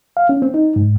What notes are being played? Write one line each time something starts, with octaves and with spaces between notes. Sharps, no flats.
F5
C#4
C4
D#4
G#2